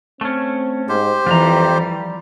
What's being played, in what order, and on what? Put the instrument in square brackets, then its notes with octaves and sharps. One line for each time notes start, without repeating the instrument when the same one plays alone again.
[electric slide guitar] A3 C#4 [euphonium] C4
[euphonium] G#2 [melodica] G4 C5
[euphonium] F2 [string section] E3 [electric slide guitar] F3 G3 A#5